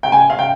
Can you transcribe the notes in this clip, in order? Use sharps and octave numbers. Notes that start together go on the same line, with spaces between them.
G5
G#5
F5
G5